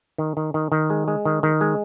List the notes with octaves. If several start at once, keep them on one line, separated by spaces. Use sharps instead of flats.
D#3
D#3
D#3
D#3
G#3
G#3
D#3
D#3
G#3